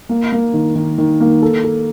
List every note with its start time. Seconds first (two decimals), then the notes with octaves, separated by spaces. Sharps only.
0.09 A#3
0.32 A#3
0.54 D#3
0.75 D#3
0.98 D#3
1.20 A#3
1.42 A4
1.64 A4